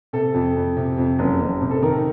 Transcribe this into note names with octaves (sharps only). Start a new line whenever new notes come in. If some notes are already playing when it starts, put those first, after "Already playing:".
C3 A4
F2
F2
C3
F2
F#1
F#1
C3
A4
D#3 A#4